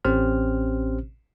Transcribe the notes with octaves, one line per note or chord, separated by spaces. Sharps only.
A1 C4 C#4 G4 C5 F6